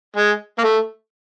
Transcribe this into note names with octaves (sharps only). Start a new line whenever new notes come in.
G#3
A#3
A3